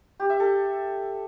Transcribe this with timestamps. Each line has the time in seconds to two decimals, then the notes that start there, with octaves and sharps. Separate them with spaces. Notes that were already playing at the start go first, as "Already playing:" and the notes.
0.20 G4
0.30 E5
0.40 A4